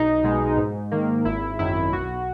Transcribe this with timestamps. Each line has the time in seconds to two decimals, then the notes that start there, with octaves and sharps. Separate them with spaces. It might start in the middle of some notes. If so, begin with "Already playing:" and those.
Already playing: B1 D#4
0.24 B2 G#3
0.57 G#2
0.91 D#3 A#3
1.25 G#1 E4
1.59 F#2 D#3 E4
1.93 B1 F#4